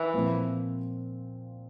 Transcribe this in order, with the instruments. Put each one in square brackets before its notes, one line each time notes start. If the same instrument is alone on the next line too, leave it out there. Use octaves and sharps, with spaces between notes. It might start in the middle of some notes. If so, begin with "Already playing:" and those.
Already playing: [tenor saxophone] E3
[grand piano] A#2 F3 C4 F4